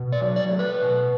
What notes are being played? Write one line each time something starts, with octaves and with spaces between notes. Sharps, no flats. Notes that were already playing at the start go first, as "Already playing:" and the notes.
Already playing: B2
D5
F#3
D5
A3
B4
B2